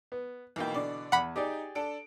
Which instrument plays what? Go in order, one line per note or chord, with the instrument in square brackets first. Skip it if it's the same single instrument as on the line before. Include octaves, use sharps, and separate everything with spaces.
[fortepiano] B3
[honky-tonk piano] B1 A#3 G5 [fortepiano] B2 E3
[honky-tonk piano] D3 D5
[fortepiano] E2 [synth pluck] F#5 B5
[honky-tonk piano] D#4 [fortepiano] G4 G#4 D5
[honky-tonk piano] D4 A4 D7